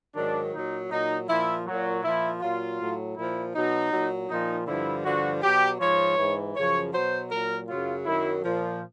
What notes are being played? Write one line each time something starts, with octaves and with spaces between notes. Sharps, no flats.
G#2 D#3 F#3 D4
A#2 F#3 D#4
A#2 F#3 D#4
A#2 F3 E4
A#2 F#3
A#2 F3 E4
A#2 F#3 F4
A2 F#3
A#2 F3 E4
B2 F#3 D#4
A#2 F#3
A#2 F3 D#4
G2 D3 F3 E4
G2 D3 F3 F#4
B2 F#3 G4
G#2 F3 C#5
G#2 E3
F#2 C#3 F3 C#5
B2 F#3 C5
A#2 F#3 A#4
F#2 C#3 F#3 F4
F#2 D#3 F#3 E4
A#2 F3